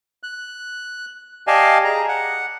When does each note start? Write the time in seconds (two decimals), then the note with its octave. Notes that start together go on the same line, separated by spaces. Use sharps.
0.23 F#6
1.47 G4 D5 D#5 F5 G#5 A5
1.84 G#4 A#5
2.09 F#5